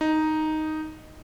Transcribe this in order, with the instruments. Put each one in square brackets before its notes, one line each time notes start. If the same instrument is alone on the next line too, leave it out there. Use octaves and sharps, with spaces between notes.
[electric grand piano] D#4